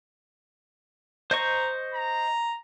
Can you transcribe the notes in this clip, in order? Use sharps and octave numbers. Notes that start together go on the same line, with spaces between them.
C5 D#5 A#5 C#6
A#5